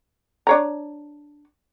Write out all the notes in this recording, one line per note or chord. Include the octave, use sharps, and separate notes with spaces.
D4 C#5 A#5